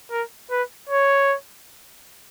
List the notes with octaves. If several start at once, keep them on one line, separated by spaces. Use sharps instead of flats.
A#4
B4
C#5